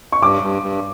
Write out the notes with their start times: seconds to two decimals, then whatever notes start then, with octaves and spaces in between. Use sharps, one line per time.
0.12 C#6
0.22 G2 D6
0.42 G2
0.62 G2